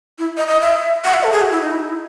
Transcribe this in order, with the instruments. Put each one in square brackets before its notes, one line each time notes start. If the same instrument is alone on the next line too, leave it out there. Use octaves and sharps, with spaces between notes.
[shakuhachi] E4
D#5
D#5
E5
F#5
E5
A4
G#4
F#4
E4
D#4
E4
D#4
E4